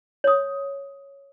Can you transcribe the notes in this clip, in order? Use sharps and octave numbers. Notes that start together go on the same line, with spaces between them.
C#5 D#6